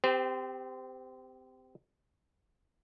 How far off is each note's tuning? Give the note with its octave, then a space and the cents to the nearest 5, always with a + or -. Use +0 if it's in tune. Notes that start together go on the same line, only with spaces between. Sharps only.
C4 -25 G4 +15 C5 -30